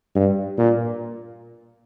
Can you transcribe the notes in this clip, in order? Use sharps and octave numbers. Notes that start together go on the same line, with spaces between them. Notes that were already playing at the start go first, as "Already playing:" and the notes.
G2
A#2